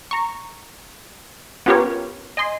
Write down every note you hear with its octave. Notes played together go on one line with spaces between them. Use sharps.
A#5 C#6
B3 C#4 F4 G4 A#4 C#5
D#5 G#5 C6